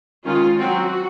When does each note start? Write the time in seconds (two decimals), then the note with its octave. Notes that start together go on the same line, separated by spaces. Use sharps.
0.25 D#3 G#3 C#4 F4
0.59 F#3 C4 F#4